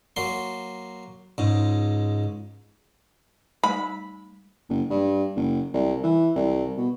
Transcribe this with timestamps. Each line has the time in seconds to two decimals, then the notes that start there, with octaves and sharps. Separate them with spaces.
0.16 F#3 A#3 C6
1.38 C#2 G#2
3.64 G3 A3 D#4 B5
4.69 F#1
4.90 G2
5.36 F#1
5.74 C2
6.03 E3
6.35 C2
6.78 B2